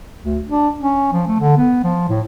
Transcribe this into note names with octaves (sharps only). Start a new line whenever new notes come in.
D2
D4
C#4
F3
A3
D3
B3
F3
A2